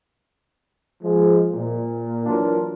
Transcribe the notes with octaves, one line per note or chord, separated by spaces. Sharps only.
F3 G#3
A#2
E3 F#3 D4 F4 A#4